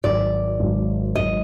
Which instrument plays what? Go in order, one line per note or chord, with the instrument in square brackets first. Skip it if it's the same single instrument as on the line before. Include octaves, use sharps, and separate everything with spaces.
[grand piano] G#1 G#2 D#3 F#3 [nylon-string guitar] D5
[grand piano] G#1 G#2 D#3 F#3
[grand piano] G#1 G#2 D#3 F#3 [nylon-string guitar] D#5